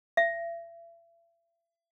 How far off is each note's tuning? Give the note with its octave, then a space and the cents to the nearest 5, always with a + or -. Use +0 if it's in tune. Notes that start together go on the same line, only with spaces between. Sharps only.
E5 +40